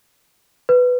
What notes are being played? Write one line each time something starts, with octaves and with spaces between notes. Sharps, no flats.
B4